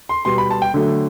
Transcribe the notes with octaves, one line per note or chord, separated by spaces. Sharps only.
C6
B2 G3 C6
B5
A5
G5
D3 F#3 A3